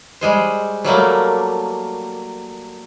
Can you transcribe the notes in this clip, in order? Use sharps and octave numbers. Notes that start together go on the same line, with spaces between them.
G3 G#3 C5
F#3 G3 A3 A#3